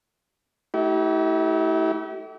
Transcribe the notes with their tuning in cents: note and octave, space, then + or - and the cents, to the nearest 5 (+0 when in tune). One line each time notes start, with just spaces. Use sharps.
A3 +0 E4 -40 G4 -45